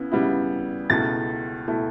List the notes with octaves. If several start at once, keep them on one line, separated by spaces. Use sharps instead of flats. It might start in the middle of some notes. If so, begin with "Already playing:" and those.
Already playing: C#3 B3 E4
C#3 G3 B3 E4
C#2 B2 A3 E4 A6
B2 A3 E4